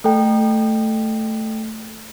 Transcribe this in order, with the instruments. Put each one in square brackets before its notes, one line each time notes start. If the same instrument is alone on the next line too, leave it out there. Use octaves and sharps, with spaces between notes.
[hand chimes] A3 A4 G5